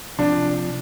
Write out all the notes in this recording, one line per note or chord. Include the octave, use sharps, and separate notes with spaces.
C3 F3 C4 D4 F4